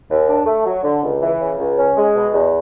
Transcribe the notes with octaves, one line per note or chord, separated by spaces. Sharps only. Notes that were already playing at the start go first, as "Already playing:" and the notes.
D#2
D4
A3
F#3
D3
C#2
E3
C#3
C#2
C#4
G#3
B2
E2